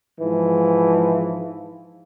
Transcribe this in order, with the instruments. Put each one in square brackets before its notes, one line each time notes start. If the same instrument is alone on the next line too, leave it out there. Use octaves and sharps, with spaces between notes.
[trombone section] G#2 E3 F3